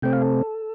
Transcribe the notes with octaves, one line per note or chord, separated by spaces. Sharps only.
C3 A3 C4 G5
F5
A4